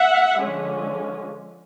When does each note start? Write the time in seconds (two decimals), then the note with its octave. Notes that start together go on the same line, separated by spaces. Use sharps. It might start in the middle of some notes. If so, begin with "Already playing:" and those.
Already playing: E5 F#5
0.40 D3 F3 G#3 C#4